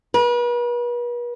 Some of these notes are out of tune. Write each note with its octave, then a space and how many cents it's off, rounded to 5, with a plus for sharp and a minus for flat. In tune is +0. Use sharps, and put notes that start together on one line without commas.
B4 -40